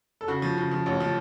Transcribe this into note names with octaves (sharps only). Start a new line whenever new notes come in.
A4
C#3 F#4
F3
C#3
F3
A1
F3